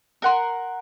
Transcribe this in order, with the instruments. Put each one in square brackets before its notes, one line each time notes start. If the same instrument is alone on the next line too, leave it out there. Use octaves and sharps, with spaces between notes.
[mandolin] A#4 F#5 C6